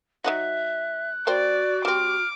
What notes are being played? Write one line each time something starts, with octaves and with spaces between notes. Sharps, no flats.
F#3 D#4 F#4 E5 F#6
A#3 F#4 C5 D5 G5
G3 C4 D6 F6